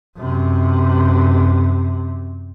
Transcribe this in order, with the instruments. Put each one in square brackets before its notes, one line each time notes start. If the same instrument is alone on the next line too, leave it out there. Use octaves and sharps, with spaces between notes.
[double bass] F#2 C3